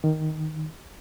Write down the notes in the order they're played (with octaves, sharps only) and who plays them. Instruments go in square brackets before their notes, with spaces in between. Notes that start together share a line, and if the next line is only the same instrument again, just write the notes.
[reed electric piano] D#3